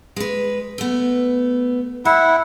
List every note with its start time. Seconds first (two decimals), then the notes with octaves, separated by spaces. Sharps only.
0.16 G#3 B4
0.78 A3 B3
2.05 E4 E5 F#5